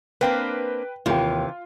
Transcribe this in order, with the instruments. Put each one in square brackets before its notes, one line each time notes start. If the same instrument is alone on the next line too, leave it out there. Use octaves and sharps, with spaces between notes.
[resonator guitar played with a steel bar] A#3 C4 D4 [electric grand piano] B4 G5
[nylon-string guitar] D#2 G5 [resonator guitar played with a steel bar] C3 E3 [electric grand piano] F4